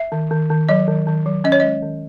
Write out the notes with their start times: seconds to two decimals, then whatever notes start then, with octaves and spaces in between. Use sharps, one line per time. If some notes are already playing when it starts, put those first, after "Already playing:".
Already playing: E5
0.12 D#3
0.31 D#3
0.50 D#3
0.69 F#3 D#5
0.88 D#3
1.07 D#3
1.26 F#3
1.44 C#4 D#5
1.52 C#5
1.60 G#3 D#5
1.82 D#3